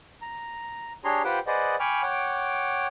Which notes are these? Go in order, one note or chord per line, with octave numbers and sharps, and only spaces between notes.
A#5
D4 G4 G#4 C#5 A#5 C6
F4 G4 B4 C5 F#5 G5
G#4 B4 C5 D5 D#5 F#5
G5 G#5 B5 C#6 D6 F6
C#5 F#5 G5 D6